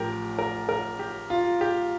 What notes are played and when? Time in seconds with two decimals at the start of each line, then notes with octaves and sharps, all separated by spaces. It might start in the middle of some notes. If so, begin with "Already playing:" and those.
Already playing: A1 A2 F3 G4 A#4
0.39 A#4
0.69 A#4
0.99 G4
1.30 F4
1.61 G4